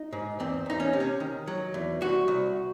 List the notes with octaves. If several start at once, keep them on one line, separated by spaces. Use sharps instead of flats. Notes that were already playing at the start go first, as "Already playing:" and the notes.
Already playing: D#4
G#2
E2 C4
E2 D#4
C#4
C3
C#4
D#3
F#3
E2
C2 F#4
C2